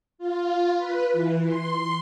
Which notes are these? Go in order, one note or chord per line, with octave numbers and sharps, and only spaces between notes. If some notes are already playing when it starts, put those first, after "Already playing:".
F4
B4
E3
C6